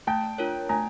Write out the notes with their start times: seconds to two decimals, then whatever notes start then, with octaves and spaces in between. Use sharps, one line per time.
0.07 A3 G5 A5
0.38 D4 F4 A#4 C#5
0.69 A3 G#5 A#5